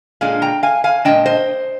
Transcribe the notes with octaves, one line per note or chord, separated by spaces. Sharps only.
A#2 G#3 D4 F5 G#5
G5 A#5
F5 G#5
F5 G#5
A#2 G#3 D4 D#5 G5
C5 D#5